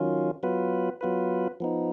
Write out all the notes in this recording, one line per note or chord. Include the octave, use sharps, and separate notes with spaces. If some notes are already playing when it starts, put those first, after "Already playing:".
Already playing: D#3 F#3 C#4 F4
F#3 B3 F4 B4
F#3 B3 F4 B4
F3 B3 D#4